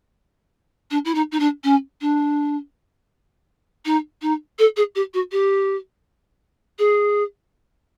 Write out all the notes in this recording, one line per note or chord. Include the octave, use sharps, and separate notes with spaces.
D4
E4
D#4
D#4
D4
C#4
D4
D#4
D#4
A4
G#4
G4
F#4
G4
G#4